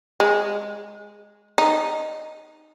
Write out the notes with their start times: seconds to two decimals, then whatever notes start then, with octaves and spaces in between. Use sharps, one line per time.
0.20 G#3
1.58 D#4